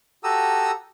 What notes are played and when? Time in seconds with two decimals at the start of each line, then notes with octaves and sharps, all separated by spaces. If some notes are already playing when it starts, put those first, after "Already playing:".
0.24 F#4 G4 A4 A#5 D#6 E6